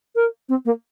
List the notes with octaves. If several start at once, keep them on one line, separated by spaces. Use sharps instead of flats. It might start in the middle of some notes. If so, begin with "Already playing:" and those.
A#4
C4
A#3